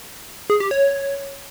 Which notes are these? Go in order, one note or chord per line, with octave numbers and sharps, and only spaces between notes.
G#4
G4
C#5